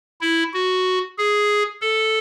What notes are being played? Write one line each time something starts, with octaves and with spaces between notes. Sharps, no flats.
E4
F#4
G#4
A4